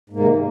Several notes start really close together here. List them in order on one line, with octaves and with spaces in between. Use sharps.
G#2 A#3 C3 D#3